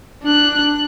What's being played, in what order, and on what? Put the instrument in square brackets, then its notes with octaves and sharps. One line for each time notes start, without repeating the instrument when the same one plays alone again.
[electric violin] D4 F#6